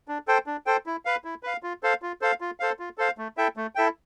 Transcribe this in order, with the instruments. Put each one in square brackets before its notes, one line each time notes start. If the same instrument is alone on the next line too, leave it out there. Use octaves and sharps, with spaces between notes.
[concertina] D4
A4 C5 G5
D4
A4 C5 G5
E4
B4 F5
E4
B4 F5
F4
A4 C5 F5
F4
A4 C5 F5
F4
A4 C5 F5
F4
A4 C5 F5
A3
E4 A4 E5 G5
A3
E4 A4 E5 G5